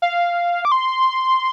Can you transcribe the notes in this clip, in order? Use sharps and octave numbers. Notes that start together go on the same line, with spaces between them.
F5
D6
C6